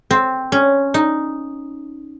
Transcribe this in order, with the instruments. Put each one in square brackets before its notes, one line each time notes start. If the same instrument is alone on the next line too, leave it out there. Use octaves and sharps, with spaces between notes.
[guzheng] C4
C#4
D#4